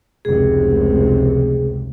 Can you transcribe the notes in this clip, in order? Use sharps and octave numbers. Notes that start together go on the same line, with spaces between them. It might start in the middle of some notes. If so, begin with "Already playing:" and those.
F1 C#2 C3 G#4